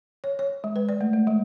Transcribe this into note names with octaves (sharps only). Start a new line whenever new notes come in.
C#5
C#5
G#3
B4
D5
A3
A3
G#3